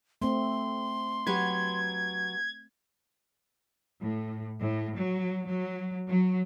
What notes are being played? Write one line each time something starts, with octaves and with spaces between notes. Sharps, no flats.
A3 C4 C6
F#3 G4 B4 G#6
A2
A2
F#3
F#3
F#3